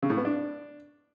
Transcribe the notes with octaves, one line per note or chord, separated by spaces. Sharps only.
C#3
A2
B3
D4